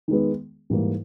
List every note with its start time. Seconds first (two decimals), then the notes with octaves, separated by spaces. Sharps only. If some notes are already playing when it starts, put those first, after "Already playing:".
0.08 D#3 G#3 B3
0.70 G#2 E3 G3 A#3